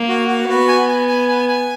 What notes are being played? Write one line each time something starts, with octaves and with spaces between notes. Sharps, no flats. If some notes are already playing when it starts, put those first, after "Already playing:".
Already playing: A#3
F#4
F#4
B3 F#4
G#5
G#5
G#5
G#5
G#5